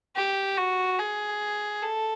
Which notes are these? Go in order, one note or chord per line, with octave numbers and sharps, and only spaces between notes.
G4
F#4
G#4
A4